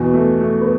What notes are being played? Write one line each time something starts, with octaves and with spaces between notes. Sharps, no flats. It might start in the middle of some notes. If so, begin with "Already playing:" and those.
Already playing: E2 B2 B3
A3
A3
B3